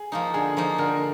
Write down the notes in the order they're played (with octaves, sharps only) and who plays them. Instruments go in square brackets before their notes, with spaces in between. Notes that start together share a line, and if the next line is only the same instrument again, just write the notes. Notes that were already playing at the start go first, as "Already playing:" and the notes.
Already playing: [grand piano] G#4
[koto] F3 A#3 D#4
[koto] D3 [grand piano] G#4
[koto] F3 A#3 D#4
[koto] D3 [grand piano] A#4